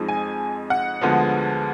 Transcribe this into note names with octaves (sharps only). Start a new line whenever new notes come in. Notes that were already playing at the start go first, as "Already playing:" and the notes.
Already playing: F2 F3 G#3 D#4
G#5
F#5
D2 D3 F3 G#3 B3